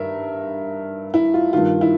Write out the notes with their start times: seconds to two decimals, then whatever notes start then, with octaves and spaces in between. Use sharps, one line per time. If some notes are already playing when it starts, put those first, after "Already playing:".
Already playing: G2 D#3 A#4 E5
1.14 E4
1.34 F4
1.53 G2 D#3 F4
1.81 E4